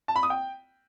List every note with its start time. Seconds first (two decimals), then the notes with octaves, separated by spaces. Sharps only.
0.08 A5
0.16 B5
0.23 D#6
0.30 G5